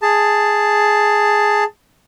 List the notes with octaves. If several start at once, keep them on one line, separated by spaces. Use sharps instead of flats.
G#4 A5